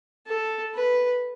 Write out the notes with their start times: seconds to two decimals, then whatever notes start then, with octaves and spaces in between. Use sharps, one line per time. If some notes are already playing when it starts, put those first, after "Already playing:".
0.26 A4
0.75 B4